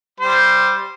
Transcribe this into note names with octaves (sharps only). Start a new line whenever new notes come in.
G3 C5